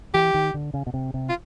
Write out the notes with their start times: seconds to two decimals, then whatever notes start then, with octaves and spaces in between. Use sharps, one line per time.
0.14 E3 G4
0.34 D#3
0.54 D3
0.74 C#3
0.87 B2
0.94 C3
1.14 C3
1.29 F4